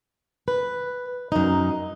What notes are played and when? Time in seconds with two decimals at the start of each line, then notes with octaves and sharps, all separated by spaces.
0.48 B4
1.32 F#2 D#4